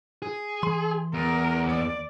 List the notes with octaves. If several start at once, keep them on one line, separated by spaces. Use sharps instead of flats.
G#4
E3 C6
E2 A#4
D#2 D5